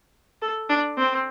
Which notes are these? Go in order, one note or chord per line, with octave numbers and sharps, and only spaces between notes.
A4
D4
C4